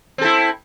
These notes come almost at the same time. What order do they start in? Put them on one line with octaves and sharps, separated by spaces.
C4 A4 E4